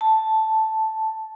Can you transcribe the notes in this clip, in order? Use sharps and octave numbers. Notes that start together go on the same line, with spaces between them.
A5